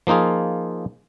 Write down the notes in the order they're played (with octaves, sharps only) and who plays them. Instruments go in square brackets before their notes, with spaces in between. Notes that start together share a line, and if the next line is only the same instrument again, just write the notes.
[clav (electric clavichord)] F3 A#3 D#4 F4 G#4